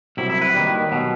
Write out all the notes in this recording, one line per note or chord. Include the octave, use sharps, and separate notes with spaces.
C2 C3 F#3 E4
E4
B4
D#2 D#3 G3
B2 F#3